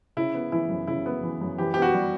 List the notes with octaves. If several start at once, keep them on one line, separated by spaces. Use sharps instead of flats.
C#3 E4
B3
E3 E4
F#2
C#3 E4
B3
E3
F#2
E3 G4
B3 G4
F#4
G3